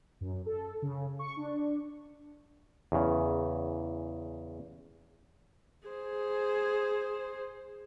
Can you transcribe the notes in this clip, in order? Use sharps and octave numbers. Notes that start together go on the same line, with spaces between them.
F#2
A4
C#3
C#6
D4
E2 C#3
G#4 C5